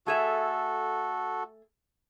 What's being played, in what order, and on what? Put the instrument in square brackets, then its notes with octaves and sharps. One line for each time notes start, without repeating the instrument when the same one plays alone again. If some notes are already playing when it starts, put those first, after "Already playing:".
[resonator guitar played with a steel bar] A3 G#4 E5 [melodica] F#4 A4